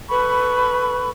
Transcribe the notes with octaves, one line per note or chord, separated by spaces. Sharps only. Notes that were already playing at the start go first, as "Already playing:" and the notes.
A4 B4 B5 C#6